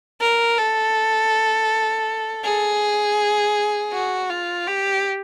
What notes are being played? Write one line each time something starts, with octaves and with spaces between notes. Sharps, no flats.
A#4
A4
G#4
F#4
F4
G4